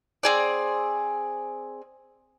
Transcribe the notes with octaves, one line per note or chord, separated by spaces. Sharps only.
C4 G#4 D5